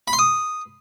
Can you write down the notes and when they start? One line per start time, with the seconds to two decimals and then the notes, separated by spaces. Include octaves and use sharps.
0.08 B5
0.13 C6
0.19 D#6